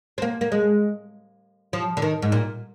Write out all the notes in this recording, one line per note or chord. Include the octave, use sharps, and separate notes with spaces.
C4
A#3
A#3
G#3
F3
D3
D#3
G#2
A#2